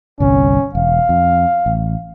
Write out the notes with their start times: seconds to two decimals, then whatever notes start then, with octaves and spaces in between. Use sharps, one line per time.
0.20 G1 C2 C#4
0.75 E1 F5
1.09 F2
1.66 A1